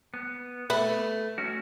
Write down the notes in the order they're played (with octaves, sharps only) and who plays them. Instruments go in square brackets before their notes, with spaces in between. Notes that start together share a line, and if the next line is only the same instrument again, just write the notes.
[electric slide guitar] B3
[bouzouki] A3 [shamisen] B4
[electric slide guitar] A3 C#4 F#4